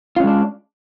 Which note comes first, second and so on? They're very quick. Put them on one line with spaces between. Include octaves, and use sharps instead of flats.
F4 C#4 G#3 D4